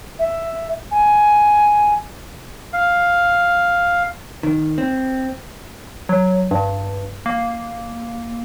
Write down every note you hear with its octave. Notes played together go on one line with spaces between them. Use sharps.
E5
G#5
F5
D#3
C4
F#3
G2
A#3